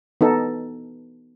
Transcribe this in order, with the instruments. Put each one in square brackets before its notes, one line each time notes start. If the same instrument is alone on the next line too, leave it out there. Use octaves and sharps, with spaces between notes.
[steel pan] B3 D#4 A4